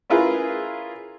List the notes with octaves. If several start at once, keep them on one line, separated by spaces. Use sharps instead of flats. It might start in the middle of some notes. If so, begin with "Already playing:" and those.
C#4 E4 F4 G#4 A#4 B4